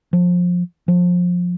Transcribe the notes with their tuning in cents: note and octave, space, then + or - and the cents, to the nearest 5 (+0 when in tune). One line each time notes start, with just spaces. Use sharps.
F3 +25
F3 +25